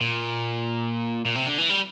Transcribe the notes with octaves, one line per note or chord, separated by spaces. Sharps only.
A#2
A#2
C3
D3
E3
G3